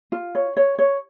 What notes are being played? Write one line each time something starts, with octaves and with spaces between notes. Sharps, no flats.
F4
C#5
C#5
C#5